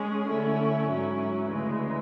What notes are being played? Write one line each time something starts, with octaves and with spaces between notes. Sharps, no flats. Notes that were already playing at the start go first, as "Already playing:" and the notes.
Already playing: G#3 C#4 G#4
D3 A3 C#4 E4
G#2 F#3 C#4 E4
D2 C#3 E3 G#3